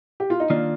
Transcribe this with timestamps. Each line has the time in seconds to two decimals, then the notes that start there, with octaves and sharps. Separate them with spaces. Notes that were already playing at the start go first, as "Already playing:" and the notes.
0.20 G4
0.30 F4
0.40 D#4
0.50 D#3 A#3 D4 F4